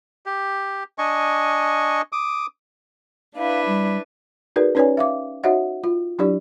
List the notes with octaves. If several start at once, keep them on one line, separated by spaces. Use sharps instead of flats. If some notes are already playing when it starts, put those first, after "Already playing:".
G4
D4 D#5 G#5 C#6
D6 D#6
D4 E4 B4 F5
G3
D#4 F#4 G#4 A#4 B4 D5
C#4 D#4 B4 C#5 D5 G#5
E5 F5 D6
D#4 F#4 C#5 D#5 E5 F#5
F4
F#3 D4 E4 G4 D5